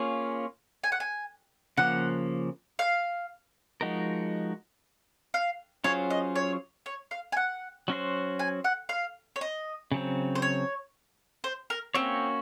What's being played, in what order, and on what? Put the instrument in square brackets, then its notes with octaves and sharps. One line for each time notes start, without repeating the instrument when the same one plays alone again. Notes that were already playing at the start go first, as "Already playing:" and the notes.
Already playing: [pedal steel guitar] A#3 C#4 F4 G#4 C#5
[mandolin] G#5
F#5
G#5
[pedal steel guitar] C#3 F3 A#3 [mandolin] F#5
[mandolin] F5
[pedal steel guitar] F3 G#3 D#4 F#4 A#4
[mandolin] F5
[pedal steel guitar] F#3 C#4 F4 G#4 C5 [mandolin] C#5
[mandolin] D#5
C#5
C#5
F5
G#5
F#5
[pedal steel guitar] F#3 C#4 F#4 C5
[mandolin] G#5
F#5
F5
C#5
D#5
[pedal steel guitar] C#3 F#3 C4
[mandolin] C5
C#5
C5
A#4
[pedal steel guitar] A#3 C#4 F#4 C#5 [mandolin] C4